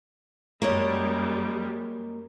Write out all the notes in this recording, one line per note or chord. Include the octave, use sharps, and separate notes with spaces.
F#2 G3 G#3 A#3 C#5 D#5